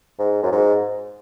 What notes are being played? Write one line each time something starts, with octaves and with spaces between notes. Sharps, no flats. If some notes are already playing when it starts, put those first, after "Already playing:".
G#2
F#2
G#2